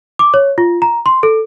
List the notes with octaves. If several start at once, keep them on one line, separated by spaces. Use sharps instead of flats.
D6
C#5
F4
A#5
C6
A4